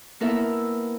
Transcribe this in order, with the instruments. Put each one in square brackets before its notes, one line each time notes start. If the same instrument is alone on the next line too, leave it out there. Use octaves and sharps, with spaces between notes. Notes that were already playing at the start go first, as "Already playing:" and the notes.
[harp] A#3 B3 E4 A4 A#4 E5